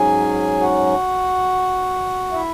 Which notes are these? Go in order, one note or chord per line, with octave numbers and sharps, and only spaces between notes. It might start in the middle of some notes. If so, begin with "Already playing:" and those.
Already playing: G#2 F#3 C#4 G#4 G#5
F#4 F#5
E4 E5